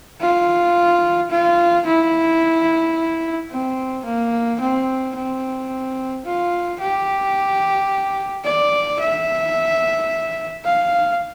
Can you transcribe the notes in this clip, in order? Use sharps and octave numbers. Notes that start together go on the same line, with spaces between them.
F4
F4
E4
C4
A#3
C4
C4
F4
G4
D5
E5
F5